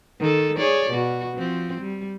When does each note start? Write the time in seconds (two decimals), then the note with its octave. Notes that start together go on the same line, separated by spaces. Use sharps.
0.20 D#3 A4
0.57 G#4 C#5 D5
0.91 B2 F#4
1.37 F3 C4
1.81 G3